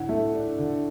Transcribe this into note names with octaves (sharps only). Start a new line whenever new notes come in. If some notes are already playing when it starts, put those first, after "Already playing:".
Already playing: A2 D3 F#5
A3 E5
D4
D3